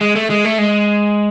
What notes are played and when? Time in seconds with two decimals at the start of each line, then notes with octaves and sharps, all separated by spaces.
0.01 G#3
0.15 A3
0.30 G#3
0.45 A3
0.58 G#3